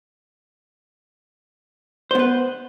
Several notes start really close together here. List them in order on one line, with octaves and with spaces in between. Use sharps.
C5 B3 B4